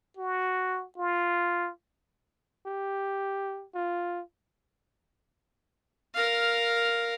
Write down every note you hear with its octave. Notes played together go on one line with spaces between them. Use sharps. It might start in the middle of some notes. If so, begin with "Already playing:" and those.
F#4
F4
G4
F4
A#4 F5